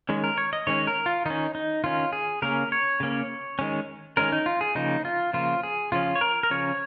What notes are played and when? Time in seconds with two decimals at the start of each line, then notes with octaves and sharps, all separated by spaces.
0.09 D#3 G#3 C#4
0.24 A#4
0.38 C#5
0.53 D#5
0.67 D#3 G#3 C#4 C#5
0.87 A#4
1.06 F4
1.26 D#3 C#4 D#4
1.55 D#4
1.84 D#3 C#4 F4
2.13 G#4
2.42 C#3 A#3 C#4 A#4
2.72 C#5
3.00 C#3 A#3 C#4
3.59 D#3 G#3 C#4
4.17 D#3 G#3 C#4 A#4
4.32 D#4
4.46 F4
4.61 G#4
4.75 C#3 F3 A#3 D#4
5.05 F4
5.33 C#3 F3 A#3 F4
5.63 G#4
5.92 C#3 F3 C#4 F4
6.15 C#5
6.21 A#4
6.43 A#4
6.50 C#3 F3 C#4 C#5